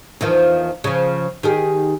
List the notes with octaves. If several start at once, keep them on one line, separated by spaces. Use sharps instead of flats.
E2 D#3 F3
C#3 F3
D#3 G4 G#4